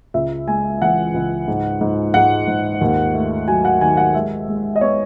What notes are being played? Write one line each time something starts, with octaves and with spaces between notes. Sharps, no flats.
C#2 E5
G#3 G#5
E3 F#5
C#2
G#2
G#2
G#2 F#5
G#2
D#2
A3
F#3 G#5
F#5
D#3 G#5
F#5
G#3 E5
G#3
D#5
B3 C#5